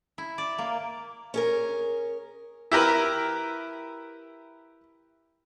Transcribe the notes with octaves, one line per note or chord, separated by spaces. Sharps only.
E4
D5
A#3
C#4 G#4 A#4
E4 G4 A#4 B4